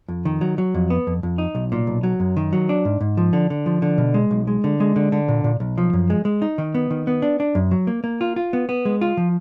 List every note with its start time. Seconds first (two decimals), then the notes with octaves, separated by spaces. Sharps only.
0.08 F2
0.25 D#3
0.41 F#3
0.58 F#3
0.75 F2
0.90 B3
1.07 F2
1.23 F2
1.38 D#4
1.55 B1
1.72 A#2
1.87 B1
2.03 F#3
2.20 F#2
2.37 D#3
2.53 F#3
2.69 D4
2.85 G#2
3.00 G#2
3.17 F3
3.33 D3
3.50 D3
3.66 F3
3.82 D3
3.98 B2
4.14 G#3
4.31 B1
4.47 G#3
4.64 D3
4.80 G#3
4.96 D3
5.12 D3
5.28 A#2
5.44 A#2
5.60 B1
5.78 F3
5.93 F#2
6.10 G#3
6.25 G#3
6.42 D#4
6.58 D#3
6.75 B3
6.90 D#3
7.07 B3
7.22 D4
7.40 D4
7.55 F#2
7.71 F#3
7.87 A#3
8.04 A#3
8.21 F4
8.36 F4
8.53 B3
8.69 B3
8.85 G#3
9.01 F4
9.17 F3